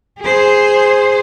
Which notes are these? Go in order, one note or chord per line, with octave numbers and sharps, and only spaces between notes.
G#4 C5